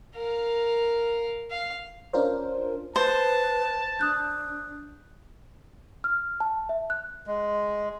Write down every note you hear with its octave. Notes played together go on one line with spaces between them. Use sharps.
A#4 F5
F5
C#4 D4 F4 A#4 C5
B4 C5 A5
D4 D#6 F#6 G6
F6
A5
E5
F#6
G#3